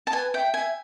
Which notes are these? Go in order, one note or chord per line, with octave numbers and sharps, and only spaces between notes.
A5
B4 G#5
E5 G5
E5 G#5